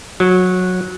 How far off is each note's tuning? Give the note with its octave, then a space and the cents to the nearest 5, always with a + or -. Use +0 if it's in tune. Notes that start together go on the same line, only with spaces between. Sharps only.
F#3 -15